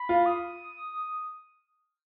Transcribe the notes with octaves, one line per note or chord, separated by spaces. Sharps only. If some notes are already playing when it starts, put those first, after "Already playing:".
Already playing: B5
F4
D#6